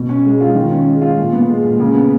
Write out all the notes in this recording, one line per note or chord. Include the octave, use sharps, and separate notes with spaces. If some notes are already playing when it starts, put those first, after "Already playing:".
Already playing: B2
C#4
G#3
F4
D#3
C#4
G#3
F4
A#2
B3
G#3
A#2
C#3
B3